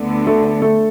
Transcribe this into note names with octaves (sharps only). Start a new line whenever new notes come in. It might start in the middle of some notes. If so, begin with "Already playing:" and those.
Already playing: D2 D3 B3
A3 A4
A3 A4